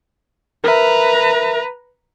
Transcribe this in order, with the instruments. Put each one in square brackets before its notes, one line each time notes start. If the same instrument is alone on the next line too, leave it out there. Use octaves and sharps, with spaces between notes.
[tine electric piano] A#4 E5 [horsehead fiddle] B4 A#5